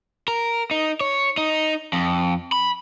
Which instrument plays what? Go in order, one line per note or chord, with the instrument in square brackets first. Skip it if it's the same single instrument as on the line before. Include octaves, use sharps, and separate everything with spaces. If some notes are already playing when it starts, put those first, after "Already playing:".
[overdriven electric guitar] A#4
D#4
C#5
D#4
F2
B5